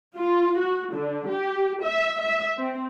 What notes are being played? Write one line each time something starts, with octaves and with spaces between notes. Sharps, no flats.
F4
F#4
D3
G4
E5
E5
C4